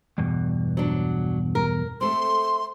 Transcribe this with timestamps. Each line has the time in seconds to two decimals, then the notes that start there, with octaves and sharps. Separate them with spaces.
0.18 E2 G2 B2
0.77 F#3 D4
1.55 A#4
2.01 A3 C4 C6